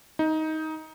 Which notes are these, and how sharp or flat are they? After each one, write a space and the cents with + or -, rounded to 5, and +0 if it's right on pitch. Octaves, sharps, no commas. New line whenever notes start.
D#4 +15